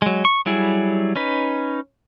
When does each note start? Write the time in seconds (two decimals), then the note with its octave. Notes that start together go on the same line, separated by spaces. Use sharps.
0.02 F#3 G#3
0.25 C#6
0.46 F#3 G3 E4 G#4
1.16 C#4 D#4 B4